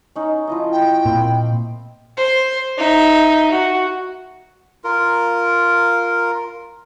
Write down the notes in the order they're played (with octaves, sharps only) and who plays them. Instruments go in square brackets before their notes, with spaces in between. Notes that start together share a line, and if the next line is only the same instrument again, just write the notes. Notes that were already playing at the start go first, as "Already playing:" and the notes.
[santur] C#4 D#4
F3 E4 D#5
[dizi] G5
[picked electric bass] A#2 [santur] C4 F5 B5
[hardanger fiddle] C5
D#4 E5
F#4
[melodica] F4 A#4